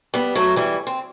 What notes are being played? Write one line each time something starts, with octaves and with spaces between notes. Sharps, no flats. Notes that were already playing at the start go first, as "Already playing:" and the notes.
G3 B3
F#3 A3
E3 G3
C4